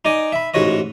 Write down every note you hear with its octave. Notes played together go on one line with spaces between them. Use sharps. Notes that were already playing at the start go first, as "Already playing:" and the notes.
D#4 D5 D#5 G#5
E5 B5
A1 G#2 F#4 C#5 D#5